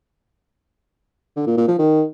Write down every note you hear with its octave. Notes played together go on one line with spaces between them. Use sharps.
D3
A#2
A#2
F3
D#3